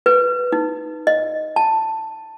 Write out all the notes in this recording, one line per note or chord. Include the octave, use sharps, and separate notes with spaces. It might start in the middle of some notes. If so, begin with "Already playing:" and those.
B4
D#4
D#5
A5